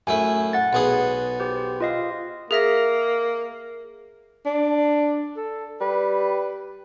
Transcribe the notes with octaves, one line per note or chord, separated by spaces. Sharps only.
F#2 A3 E4 G#5
F#5 A6
B1 B3 G#4
G4 C5
F4 D#5 F5
A#3 G#4 E5 A#6
D4
A4
G3 B4